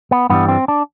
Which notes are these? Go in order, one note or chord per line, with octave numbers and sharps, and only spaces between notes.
B3
G2 E3 G3 B3
C4
D4